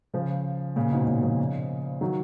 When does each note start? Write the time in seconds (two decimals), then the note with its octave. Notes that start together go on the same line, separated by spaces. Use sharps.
0.14 C#3 F3
0.76 A#2 C#3
0.92 G#2 B2
1.07 A#2 C#3
1.23 C#3 F3
2.01 D#3 F#3